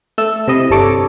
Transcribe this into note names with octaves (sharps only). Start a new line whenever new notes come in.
A3 A4 E6
C3 E4 D#5
G1 C3 D4 A4 C#5 D6